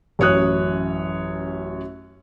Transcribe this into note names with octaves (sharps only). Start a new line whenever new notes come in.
A1 F#2 C#5 D#6 F#6